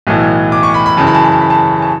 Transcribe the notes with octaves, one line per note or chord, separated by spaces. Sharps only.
B1 A2 E3
D6
C#6
B5
B5
F#2 C#3 E3 A5
B5
A5
B5
A5
B5
A5
A5